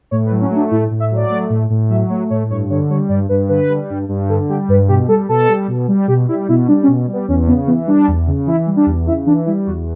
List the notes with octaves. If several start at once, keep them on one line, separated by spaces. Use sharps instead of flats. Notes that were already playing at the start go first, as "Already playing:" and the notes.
A2 C#5
B4
F#3
C#4
A3
D4
A2 E4
A2
E5
F#3 D5
A3
A2
A2
F#3 E5
A3 C#5
A2 C#5
G2 C#5
D3 C#5
G3 C#5
G2 D5
G2 B4
D3 B4
G3
G2
G2
D3 A4
G3 G4
G2 B4
B2 G4
G3 A4
B2 A4
G3
B2
G3
B2 G4
G3 E4
B2 E4
G3 D4
C#4
B2
G3
B3
E2 C#4
C#3 B3
E3 B3
G3 D4
E2
C#3
E3 E4
G3
D4
E2
C#3 E4
E3 D4
G3 E4
E2 F#4